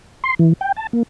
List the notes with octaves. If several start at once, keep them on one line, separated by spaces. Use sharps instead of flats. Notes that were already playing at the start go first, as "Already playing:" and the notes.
C6
E3
G5
A5
A#3